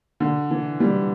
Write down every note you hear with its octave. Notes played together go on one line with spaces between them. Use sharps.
D3
E3
E3 G3